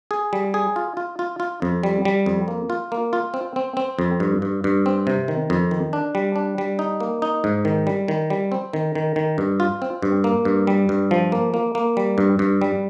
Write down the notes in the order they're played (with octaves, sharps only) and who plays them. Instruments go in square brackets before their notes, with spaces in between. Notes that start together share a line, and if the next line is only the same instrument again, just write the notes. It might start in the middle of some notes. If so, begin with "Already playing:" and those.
[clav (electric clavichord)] G#4
G3
G#4
F4
F4
F4
F4
F2
G3
G3
F2
A#3
F4
A#3
F4
C4
C4
C4
F2
G2
G2
G2
C4
C3
D#3
F2
D#3
D4
G3
D4
G3
D#4
A#3
D#4
G#2
D#3
G3
D#3
G3
C4
D#3
D#3
D#3
G2
F4
C4
G2
A#3
G2
G3
G2
F3
A#3
A#3
A#3
G3
G2
G2
G3